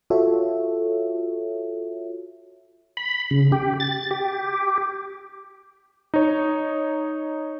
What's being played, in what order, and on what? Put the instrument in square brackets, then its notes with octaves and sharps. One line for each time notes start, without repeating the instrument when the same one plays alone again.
[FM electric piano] F4 F#4 A4 C#5 E5
[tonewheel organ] B5
C#3
G4
A6
G4
[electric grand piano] D#4 C#5